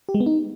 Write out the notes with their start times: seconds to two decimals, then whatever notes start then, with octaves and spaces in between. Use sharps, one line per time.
0.09 G4
0.14 G#3
0.20 B3
0.26 D#4